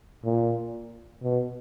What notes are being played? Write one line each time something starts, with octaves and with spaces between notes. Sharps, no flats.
A#2
B2